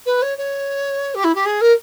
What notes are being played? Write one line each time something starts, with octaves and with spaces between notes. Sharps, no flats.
B4
C#5
C#5
G4
E4
G4
G#4
A#4